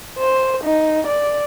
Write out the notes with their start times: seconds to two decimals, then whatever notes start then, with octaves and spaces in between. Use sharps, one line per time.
0.18 C5
0.64 D#4
1.07 D5